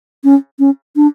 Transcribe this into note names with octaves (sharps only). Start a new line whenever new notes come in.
C#4
C#4
D4